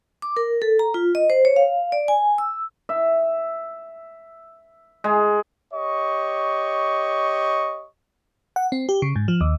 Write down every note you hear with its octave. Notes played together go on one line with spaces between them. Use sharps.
D6
A#4
A4
A#5
F4
D#5
C5
C#5
F5
D5
G#5
E6
E5
G#3
G4 C#5 D#5 C#6
F#5
C4
G4
C#3
G#2
F3
D#2